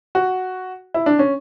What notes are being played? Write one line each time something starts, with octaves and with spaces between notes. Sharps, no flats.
F#4
E4
D4
C#4